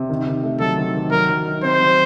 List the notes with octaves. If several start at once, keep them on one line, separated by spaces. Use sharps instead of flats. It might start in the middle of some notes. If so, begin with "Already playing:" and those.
Already playing: C3
D#3
D#3
A3
F#3 A4
D#3
D#3
F#3 A#4
F#3
D#4
C4 C5
F#3